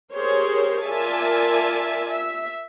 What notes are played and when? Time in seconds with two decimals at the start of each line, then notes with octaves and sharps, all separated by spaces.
0.13 G4 G#4 A#4 C5 C#5
0.86 F4 A#4 D5 E5 G#5 A5
2.09 E5